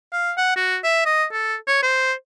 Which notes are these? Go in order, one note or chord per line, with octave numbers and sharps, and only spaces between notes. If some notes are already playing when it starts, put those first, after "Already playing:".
F5
F#5
F#4
E5
D#5
A4
C#5
C5